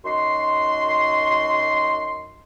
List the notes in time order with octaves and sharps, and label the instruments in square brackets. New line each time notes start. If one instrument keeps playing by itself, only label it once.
[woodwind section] F#2 D#4 F#4 C6